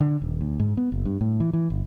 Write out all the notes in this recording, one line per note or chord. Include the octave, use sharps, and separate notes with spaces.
D3
D#1
D2
G#2
B3
F#1
G2
A2
E3
E3
G1